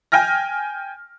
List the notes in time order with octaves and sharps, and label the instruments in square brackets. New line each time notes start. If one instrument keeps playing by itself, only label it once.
[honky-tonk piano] G5 G#5 F6 A#6